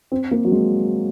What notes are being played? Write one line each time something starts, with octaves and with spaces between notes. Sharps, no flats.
C4
A#3
F#3
G#3